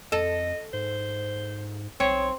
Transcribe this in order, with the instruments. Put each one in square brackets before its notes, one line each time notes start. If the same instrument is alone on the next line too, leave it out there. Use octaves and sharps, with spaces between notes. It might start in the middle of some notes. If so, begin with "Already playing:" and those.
[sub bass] F2 [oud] A4 [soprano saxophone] D#5
[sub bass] G#2 [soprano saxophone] C5
[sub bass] B1 [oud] C4 [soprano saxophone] C#5